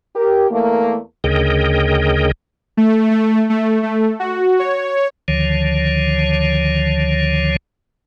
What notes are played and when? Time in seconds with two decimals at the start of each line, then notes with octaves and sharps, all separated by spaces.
0.15 G4 A#4
0.51 E2 A3 A#3
1.24 D2 C#3 G#4 A#4 D#5 G5
2.77 A3
3.11 A3
3.50 A3
3.83 A3
4.20 F#4
4.59 C#5
5.28 D2 D3 D#3 F3 C#5